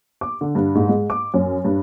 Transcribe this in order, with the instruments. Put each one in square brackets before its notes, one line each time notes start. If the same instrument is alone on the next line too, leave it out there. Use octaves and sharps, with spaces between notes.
[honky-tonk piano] D6
D3
G2
G#2
G#3
D6
F#2
G2